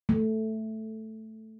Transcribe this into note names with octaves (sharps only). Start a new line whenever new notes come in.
A3